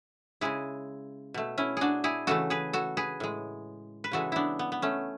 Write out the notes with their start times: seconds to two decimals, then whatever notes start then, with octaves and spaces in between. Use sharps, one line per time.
0.41 C#3 G#3 E4 G#4
1.34 B2 A3
1.58 C#4 E4
1.77 D4 F#4 G#4
2.04 E4 G#4
2.27 C#3 E3 A3 F#4 A4
2.50 G#4 B4
2.73 F#4 A4
2.97 G#4 B4
3.20 A2 G#3
4.04 B4
4.11 C#3 E3 G#3 F#4 A4
4.32 B3 D4 E4
4.59 B3
4.72 B3
4.82 A3 C#4